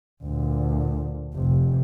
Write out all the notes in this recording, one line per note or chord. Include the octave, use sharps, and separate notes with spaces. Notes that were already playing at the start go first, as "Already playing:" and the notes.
D2 A#2
F1 C3